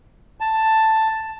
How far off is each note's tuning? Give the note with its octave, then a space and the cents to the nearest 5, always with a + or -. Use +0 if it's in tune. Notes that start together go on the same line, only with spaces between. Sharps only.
A5 +5